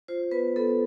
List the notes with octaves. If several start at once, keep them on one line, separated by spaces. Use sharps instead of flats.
F4 C5
B3 B4
B3 A4